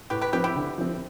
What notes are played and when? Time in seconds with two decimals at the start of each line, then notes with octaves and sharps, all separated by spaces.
0.10 A2 G4 B4
0.21 G4 B4
0.33 F3 C4 G4 B4
0.44 E4 G4
0.56 D3
0.78 F3 C4